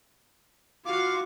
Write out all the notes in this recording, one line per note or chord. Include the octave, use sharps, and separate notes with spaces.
F4 F#4 F5 D6